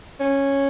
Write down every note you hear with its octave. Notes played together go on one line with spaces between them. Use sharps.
C#4